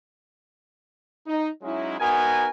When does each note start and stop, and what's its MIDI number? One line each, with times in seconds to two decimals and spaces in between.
1.27 1.48 63
1.62 1.98 54
1.62 1.98 56
1.62 1.98 61
1.62 1.98 63
1.62 1.98 64
2.00 2.47 59
2.00 2.47 63
2.00 2.47 66
2.00 2.47 70
2.00 2.47 80